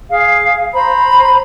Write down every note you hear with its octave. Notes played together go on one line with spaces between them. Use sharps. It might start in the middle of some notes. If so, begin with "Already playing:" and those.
G#4 F5
C5 A#5 B5